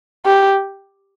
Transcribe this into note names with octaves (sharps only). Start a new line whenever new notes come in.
G4